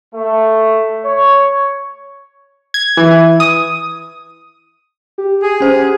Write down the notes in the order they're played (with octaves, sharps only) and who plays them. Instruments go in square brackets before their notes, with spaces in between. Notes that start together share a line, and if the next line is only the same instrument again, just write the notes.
[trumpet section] A3
C#5
[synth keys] G#6
E3
D#6
[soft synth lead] G4
[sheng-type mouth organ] G#4
[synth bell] C#4 C5